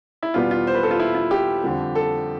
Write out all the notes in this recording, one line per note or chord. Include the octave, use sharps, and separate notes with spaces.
E4
E2 B2 G3 B3 F4
F4
C5
B4
A4
F4
E4
F4
G4
F2 D3 G3
A4